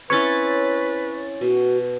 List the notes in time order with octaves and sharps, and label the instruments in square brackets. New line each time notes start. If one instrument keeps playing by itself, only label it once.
[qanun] C4 C#4 E4 [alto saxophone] B4 [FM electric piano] C#5 A6
[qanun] B2 [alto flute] F#4